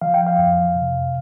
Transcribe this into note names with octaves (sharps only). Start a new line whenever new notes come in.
F3 F5
G5
F5
F2
C3